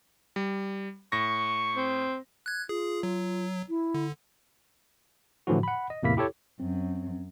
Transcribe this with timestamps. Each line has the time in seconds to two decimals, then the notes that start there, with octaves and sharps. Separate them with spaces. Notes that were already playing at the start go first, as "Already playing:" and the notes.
0.36 G3
1.12 A2 C#6 A#6
1.76 C4
2.46 F#6 G#6
2.69 F4 G#4
3.03 F#3
3.69 E4
3.94 D3
5.47 A2 D3 E3 F3 F#4
5.63 F#5 B5
5.90 D#5
6.03 E2 A2 C3 A#3 E4 B6
6.17 E4 G4 A4 C#5
6.60 F#2 C4